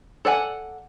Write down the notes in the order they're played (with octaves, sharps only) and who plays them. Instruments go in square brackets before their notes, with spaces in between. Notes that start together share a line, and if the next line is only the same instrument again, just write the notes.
[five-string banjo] A4 D5 F#5 G#5